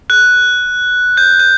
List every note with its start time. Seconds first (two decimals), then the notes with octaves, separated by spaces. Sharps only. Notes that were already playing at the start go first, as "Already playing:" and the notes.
0.10 F#6
1.17 G6
1.39 G6